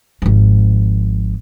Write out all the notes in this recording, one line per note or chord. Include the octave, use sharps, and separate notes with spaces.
G#1 F3